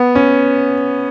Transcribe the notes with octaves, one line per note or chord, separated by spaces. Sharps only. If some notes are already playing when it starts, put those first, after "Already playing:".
Already playing: B3
C#4